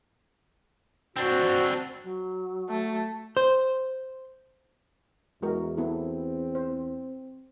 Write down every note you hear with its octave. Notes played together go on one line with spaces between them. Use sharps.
C4 D4 F#4
F#3
A3
C5
E2 G#3 E4 F#4 A#4
B3 C4 E4 A4
C5